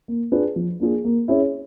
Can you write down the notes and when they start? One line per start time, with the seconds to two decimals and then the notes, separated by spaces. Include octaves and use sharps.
0.08 A#3
0.32 D4 F4 G#4 B4
0.56 F3
0.80 A#3 D4 F4 G#4
1.05 A#3
1.28 C#4 E4 G#4 C#5